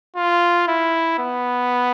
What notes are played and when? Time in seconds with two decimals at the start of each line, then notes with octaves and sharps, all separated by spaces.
0.16 F4
0.68 E4
1.19 B3